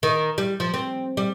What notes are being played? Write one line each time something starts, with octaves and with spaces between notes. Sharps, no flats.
D#3
G3
F3
C4
G3